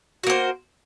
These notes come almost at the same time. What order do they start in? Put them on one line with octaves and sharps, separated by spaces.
F#4 A#3 C5